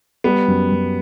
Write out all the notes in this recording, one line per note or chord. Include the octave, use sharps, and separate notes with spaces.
G3 B3
F#2
F#2